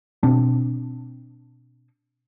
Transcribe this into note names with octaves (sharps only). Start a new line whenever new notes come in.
B2 C4 D4